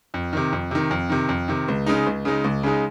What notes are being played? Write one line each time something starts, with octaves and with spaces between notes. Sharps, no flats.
F2
C3 D#3
F2
C3 D#3
F2
C3 D#3
F2
C3 D#3
C#2
C#3 G#3 D#4
C#2
C#3 G#3 D#4
C#2
C#3 G#3 D#4